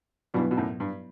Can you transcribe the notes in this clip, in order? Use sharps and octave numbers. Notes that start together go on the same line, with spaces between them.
G2 B2 F#3 B3 E4 B4
B2
F#2 A2
G2